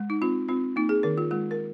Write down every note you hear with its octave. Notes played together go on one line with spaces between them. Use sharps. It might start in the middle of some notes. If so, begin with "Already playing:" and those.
Already playing: G#3
D#4
C4 F4
C4 F4
A#3 D#4
G#4
D#3 A#4
F4
G#3 F4
A#4